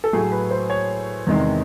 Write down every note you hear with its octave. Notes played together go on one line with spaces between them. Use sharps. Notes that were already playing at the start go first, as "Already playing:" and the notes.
A4
A2 F#3 A3 G#4
B4
C5
C#5
E2 C3 D#3 G#3